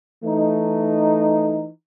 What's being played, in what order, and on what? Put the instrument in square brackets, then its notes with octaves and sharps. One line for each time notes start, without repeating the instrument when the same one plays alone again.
[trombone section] E3 A3 D#4